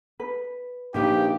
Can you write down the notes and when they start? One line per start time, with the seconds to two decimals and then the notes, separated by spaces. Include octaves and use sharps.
0.20 B4
0.94 A#1 C#3 F3 A#3 D#4 G4 B4